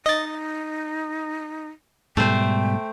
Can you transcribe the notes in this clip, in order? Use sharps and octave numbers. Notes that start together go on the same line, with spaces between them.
D#4 D#5 A6
G#2 B2 G3 A3 C5 G5